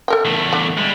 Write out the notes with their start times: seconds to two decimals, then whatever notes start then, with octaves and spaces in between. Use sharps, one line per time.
0.08 A4 A#4 G5
0.25 E2 A3
0.53 D3
0.77 G3 G#3